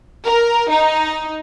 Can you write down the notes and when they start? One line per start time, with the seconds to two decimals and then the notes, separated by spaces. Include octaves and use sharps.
0.25 A#4
0.71 D#4